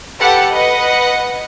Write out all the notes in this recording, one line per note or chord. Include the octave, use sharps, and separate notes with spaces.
G4 A4 B4 F#5
B4 D#5 F#5